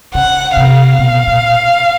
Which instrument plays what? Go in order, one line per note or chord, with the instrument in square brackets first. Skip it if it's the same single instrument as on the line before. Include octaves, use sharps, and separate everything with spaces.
[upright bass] C#3 [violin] F#5
[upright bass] C3 [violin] F5
[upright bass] B2
A#2